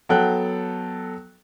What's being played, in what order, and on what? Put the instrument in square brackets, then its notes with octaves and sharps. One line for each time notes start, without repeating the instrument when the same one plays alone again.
[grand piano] F#3 B3 A4 G5 F#6